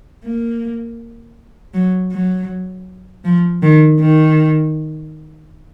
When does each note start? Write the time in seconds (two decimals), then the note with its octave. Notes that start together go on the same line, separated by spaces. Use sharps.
0.24 A#3
1.74 F#3
2.12 F#3
3.25 F3
3.63 D#3
4.00 D#3